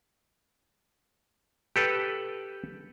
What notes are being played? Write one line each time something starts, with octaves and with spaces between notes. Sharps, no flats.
G4 A4 B4